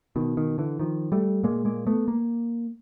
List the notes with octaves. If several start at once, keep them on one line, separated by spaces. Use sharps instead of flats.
B2 D#3
D#3
D3 E3
D#3 F3
G3 A3
A#2 G#3 A#3
G#3 A#3
A3 B3
A#3